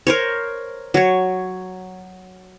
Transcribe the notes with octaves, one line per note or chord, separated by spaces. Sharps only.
A#4 C5 C#5
F#3 C#5